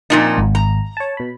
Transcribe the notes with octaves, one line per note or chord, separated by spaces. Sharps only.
F2 A#2 D#4 A5
G#1
A#5
C#5 A5
B2 B5